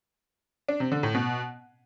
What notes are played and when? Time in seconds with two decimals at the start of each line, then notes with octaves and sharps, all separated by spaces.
0.69 D4
0.80 C3
0.92 D3
1.03 A2
1.15 B2